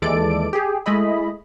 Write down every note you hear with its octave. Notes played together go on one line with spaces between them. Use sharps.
D#2 E3 G#3 A4 D5 D7
G4 G#4
G#3 A3 E4 D#5 B5